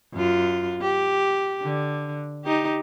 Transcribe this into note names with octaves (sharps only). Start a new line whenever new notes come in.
F#2 F4
G4
D3
D#4 G4